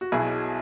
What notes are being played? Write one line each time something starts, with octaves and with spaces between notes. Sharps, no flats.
F#4
B1 B2 F#3 E4 G#4